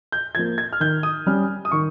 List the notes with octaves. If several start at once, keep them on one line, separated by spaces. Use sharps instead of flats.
G6
F3 A#3 G#6
G#6
F6
D#3 G6
D#6
G3 C#4 F6
D#6
D#3 C#6